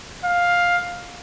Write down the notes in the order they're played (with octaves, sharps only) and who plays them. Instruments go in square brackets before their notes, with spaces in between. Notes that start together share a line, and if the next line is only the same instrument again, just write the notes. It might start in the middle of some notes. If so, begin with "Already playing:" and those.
[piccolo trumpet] F5